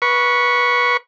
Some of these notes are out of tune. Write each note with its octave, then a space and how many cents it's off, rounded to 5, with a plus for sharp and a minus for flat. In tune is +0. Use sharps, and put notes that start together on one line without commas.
B4 -20 C#6 +0